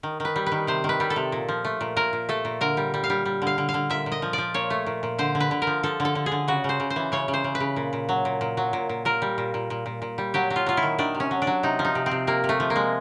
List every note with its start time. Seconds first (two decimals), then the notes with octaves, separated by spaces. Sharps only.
0.03 D#3
0.20 D#3 B4
0.36 G3
0.46 B4
0.52 D#3
0.67 C3 C5
0.84 D#3
0.89 B4
1.00 G3
1.10 A4
1.16 C3
1.32 A#2
1.49 F3
1.65 A3
1.81 A#2
1.96 A#2 A#4
2.13 A#2
2.29 A3 A4
2.45 A#2
2.61 D3 A#4
2.77 G3
2.94 G3
3.04 F5
3.10 G3
3.25 G3
3.42 D3
3.47 F5
3.58 D3
3.69 F5
3.74 D3
3.90 A#2 E5
4.06 A#2
4.12 D#5
4.22 F3
4.33 F3 D5
4.54 A#2 C#5
4.70 A3
4.86 A#2
5.03 A#2
5.19 D3 C5
5.35 D3
5.40 B4
5.51 D3
5.62 A#4
5.67 F3
5.83 F3 A4
6.00 D3
6.05 A4
6.15 D3
6.26 G#4
6.32 D3
6.48 C#3 F#4
6.64 C#3 C5
6.80 C#3
6.90 C5
6.96 E3
7.12 C#3 C#5
7.28 C#3
7.34 C5
7.44 C#3
7.55 B4
7.60 C#3
7.76 A#2
7.93 A#2
8.09 F#3
8.25 A#2
8.41 A#2
8.57 F#3
8.73 A#2
8.89 A#2
9.05 A#2 A#4
9.22 G3
9.38 A#2
9.54 A#2
9.70 A#2
9.86 A#2
10.02 A#2
10.18 G3
10.34 F#3 G4
10.50 F#3
10.56 F4
10.66 F#3 F4
10.77 E4
10.83 D#3
10.98 D#3 D4
11.15 C3
11.20 C#4
11.31 F#3
11.42 D4
11.47 F#3
11.63 C3 D#4
11.79 F3
11.85 D#4
11.95 C3
12.06 C4
12.11 C3
12.27 C3 A#3
12.44 C3
12.49 A3
12.60 F3
12.70 A#3
12.76 G#3